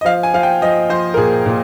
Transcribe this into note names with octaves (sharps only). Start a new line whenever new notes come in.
D#5
F3 F5
G#5
F3 F5
G5
F3 D#5
F3 C5
A#4
A#2 G#4
A#2